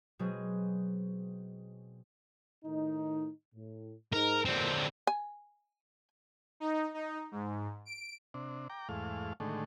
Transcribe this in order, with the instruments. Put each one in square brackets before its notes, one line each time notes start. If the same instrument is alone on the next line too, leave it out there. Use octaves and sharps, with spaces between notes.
[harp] B2 F#3 G#3 C4 G#4
[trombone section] A2 D#3 D#4
A2
[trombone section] G#2 D#4 [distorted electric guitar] A#4
[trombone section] E2 A#2 [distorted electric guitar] D3 C4
[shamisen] G#5
[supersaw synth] D#4
D#4
G#2
D7
[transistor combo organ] C3 D4
G5 A#5 D6
E2 G#2 A3 F5
A2 D3 D#3 G#3 A3